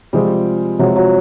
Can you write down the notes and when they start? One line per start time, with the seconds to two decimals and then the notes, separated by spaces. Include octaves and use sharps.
0.13 C3 F3 G3 G#3 C4 F4
0.79 C3 F3 F#3 G#3 C4 F4
0.96 F#3